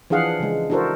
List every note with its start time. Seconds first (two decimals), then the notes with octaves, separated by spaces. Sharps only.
0.10 E3 F3 D4 G#4 F5 F#5
0.40 C#3 E3 G#3
0.70 D4 E4 F#4 A4 A#4 C5